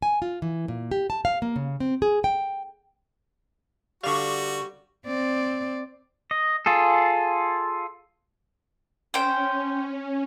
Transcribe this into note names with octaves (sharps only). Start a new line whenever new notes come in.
G#5
F4
E3
A#2
G4
A5
F5
A#3
C#3
C4
G#4
G5
D3 G3 F#4 F5 C#6
C4 D5
D#5
F4 G#4 A4
C#4 C5 G5